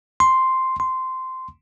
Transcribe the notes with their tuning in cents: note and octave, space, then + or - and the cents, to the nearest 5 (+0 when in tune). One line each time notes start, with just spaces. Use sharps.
C6 +0
C6 -10